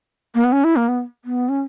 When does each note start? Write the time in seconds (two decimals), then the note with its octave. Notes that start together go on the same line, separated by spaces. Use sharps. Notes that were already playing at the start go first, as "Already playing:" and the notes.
0.35 A#3
0.44 B3
0.52 C#4
0.64 E4
0.76 A#3
0.88 B3
1.25 B3
1.49 C#4